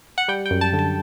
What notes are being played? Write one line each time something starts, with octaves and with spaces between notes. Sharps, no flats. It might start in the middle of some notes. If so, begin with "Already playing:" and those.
F#5
G3 G5
G5
F#2
A5
D3
A5